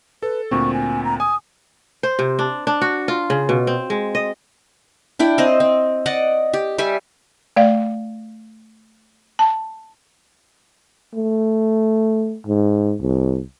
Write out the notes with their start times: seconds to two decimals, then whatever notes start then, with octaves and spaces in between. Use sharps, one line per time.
0.22 A4 B4
0.51 D2 A#2 C4 C#6
0.73 G#5
1.05 A#5
1.20 G#5 D#6
2.03 C5
2.19 C3
2.39 D4
2.67 D4
2.81 F#4
3.08 F4
3.30 C#3
3.49 B2
3.67 C4
3.90 G#3
4.15 D#5
5.19 D4 E4 G5
5.38 C4 C5 D#5
5.60 C4
6.06 D5 D#5 F#5
6.53 G4
6.78 G3 G4 E5 G#5
7.56 A3 D5 F5
9.39 A5
11.15 A3
12.47 G#2
13.01 C2